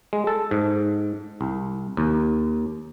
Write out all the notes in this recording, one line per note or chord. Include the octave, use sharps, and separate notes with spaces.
G#3
A4
G#2
C2
D#2